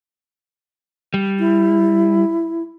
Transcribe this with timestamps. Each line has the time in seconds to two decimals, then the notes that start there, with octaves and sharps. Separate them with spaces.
1.14 G3
1.39 E4